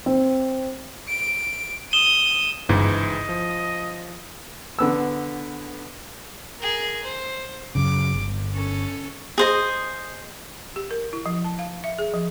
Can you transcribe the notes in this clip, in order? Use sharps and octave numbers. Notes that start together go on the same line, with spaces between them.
C4
D7
D#6 E7 G7
G1 C#2 G#2 E3 D#5
F3
D3 B3 E6
G#4 A#4
C5
F#2 C#3 D6
G1
C#4 A4
G#4 C5 D#5
G4
A#4
E4
F3
A5
F5
E5
G#4
F3